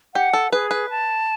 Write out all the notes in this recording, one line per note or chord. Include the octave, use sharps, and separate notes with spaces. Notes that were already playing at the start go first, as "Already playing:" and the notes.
G4 F#5
A4
G#4 B4
B4
A5